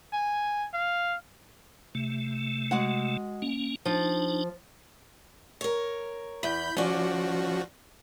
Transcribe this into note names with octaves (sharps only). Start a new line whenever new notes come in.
G#5
F5
C3 A3
G#3 F#4 F#5
A#3 C#4
F3 D4 D#4
A#4 C#5
E2 B5 G6
F3 C#4 F#4 D5